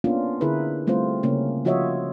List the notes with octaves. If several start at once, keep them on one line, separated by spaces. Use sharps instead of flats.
A#3 B3 C#4 D4 F4
D3 E4 G#4 A#4 B4
G3 A3 C4 F4 C5
C#3 A#3 C#4
F3 F4 F#4 C#5 D#5 E5